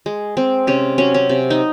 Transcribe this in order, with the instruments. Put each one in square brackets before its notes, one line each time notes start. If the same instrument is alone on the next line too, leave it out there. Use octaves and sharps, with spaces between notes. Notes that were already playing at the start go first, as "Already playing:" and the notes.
[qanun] G#3
G#3 C4
C3 C#4
F#3 C#4
C#4
C3
D#4